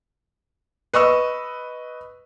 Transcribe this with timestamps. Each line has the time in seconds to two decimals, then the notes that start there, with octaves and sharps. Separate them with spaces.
0.94 B4 D#5 C#6 E6